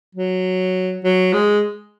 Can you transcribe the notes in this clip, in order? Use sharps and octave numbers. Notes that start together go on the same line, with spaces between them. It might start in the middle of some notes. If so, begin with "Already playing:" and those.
F#3
F#3
G#3